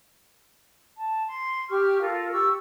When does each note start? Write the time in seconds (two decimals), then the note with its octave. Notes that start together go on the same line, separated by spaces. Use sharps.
0.97 A5
1.27 C6
1.69 G4 C#6 F6
2.01 F4 A4 A#4
2.32 G4 C#6 E6